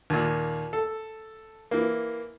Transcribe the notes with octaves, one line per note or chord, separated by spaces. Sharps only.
D#2 A#2
A4
E3 A#3